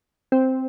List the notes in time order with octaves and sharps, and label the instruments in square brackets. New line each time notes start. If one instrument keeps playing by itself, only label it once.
[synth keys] C4